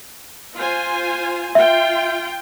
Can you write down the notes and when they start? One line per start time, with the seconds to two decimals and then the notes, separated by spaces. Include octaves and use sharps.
0.55 F4 C5 G#5
1.55 F4 E5 G5